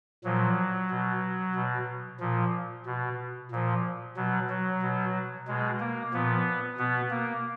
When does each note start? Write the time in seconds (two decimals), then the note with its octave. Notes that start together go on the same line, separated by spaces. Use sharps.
0.24 A#2 F3 F#3
0.90 B2
1.55 B2
2.20 A#2 F3
2.86 B2
3.51 A#2 F3
4.16 B2 F#3
4.50 F#3
4.82 B2
5.48 B2 G#3
5.80 A#3
6.14 A#2 F3 B3
6.78 B2 B3
7.10 A#3